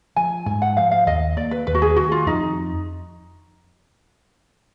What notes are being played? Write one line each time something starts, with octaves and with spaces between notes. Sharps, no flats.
F3 G#5
G#2 G#5
F#5
F3 F5
F5
D#2 D#5
A#3 D5
B4
D#2 B4
F#4
G#4
D#3 F#4
F4
F2 D#4